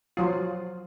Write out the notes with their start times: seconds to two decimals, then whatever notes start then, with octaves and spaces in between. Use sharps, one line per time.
0.17 F3 F#3 F4